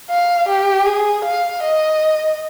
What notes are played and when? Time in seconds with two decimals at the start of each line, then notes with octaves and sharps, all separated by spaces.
0.11 F5
0.49 G4
0.87 G#4
1.25 F5
1.63 D#5